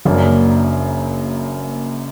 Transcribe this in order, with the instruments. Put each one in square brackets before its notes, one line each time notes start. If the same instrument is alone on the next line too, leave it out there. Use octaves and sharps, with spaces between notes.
[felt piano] F#1 F#2 F#3 A#3 D4